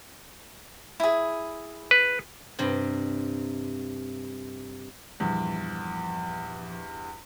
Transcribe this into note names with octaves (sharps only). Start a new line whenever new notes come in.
E4 G#4
B4
G2 C3
E2 G2 A#2 F3